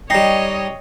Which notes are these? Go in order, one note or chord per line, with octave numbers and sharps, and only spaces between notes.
G3 D#4 C#5 D#5 G5 A#6 C7